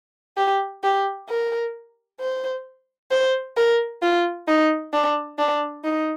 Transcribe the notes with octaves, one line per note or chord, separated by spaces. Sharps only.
G4
G4
A#4
C5
C5
A#4
F4
D#4
D4
D4
D#4